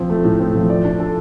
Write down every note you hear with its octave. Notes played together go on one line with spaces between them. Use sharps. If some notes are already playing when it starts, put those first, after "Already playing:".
Already playing: F3 C4
A3
A2
C4
F3
D5
D4
A4